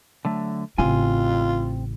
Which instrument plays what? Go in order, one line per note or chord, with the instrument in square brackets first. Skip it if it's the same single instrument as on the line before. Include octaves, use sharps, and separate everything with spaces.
[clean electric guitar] D3 F#3 A3
[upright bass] A1 C#3 [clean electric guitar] C4 G#5 [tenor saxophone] F4